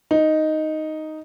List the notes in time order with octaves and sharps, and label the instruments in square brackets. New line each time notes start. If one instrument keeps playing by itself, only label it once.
[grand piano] D#4